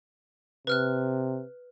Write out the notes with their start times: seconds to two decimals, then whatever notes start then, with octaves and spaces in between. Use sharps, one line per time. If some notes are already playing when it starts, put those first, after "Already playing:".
0.67 C3 B4 F6 F#6